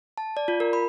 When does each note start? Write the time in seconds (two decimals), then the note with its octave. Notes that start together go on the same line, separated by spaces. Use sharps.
0.18 A5
0.37 D5
0.48 F4
0.60 A#4
0.73 B5